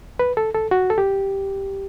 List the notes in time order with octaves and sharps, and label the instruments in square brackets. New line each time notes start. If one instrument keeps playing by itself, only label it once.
[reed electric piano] B4
A4
A4
F#4
A4
G4